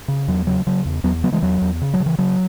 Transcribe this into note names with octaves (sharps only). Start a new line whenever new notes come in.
C#3
E2 F#3
C#3 F#3
C#3 F#3
E2
E2 F#3 B3
C#3 F#3 B3
E3 G#3
E2 F#3
E2
C#3
F#3
C#3
E3
C#3 F#3